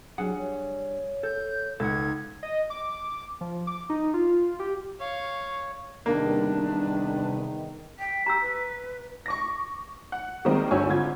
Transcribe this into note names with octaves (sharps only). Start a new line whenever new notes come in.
F#3 G3 D4 G#4 F#5
C#5
A4 G6
C#2 D#4 A4 F#5 G#6
D#5
D6
F3
D6
D#4
F4
G4
C#5 F5 C#6
E2 C3 D#3 G3 A#3 D4 B4
G5 B6
G4 A#5 E6
B4
C#6 D6 A#6
F#5
D#3 G3 G#3 A#3 C4 D#4
G1 D4 F#4 C#5 G#5 E6
G#1 D3 F4 G#6